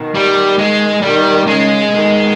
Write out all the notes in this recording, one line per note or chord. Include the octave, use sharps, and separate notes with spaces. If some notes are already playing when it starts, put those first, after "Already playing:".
Already playing: B2 D#3
G3
G#3
B2 D#3 G3
C#3 G#3
B2 D#3